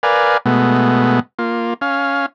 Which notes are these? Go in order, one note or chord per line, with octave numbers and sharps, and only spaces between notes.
A#4 B4 D5 F5 G#5
B2 G#3 A3 B3
A#3 F4
C#4 F5